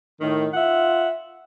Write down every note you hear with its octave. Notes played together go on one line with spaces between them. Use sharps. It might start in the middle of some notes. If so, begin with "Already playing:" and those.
A2 D#3
F4 E5 F#5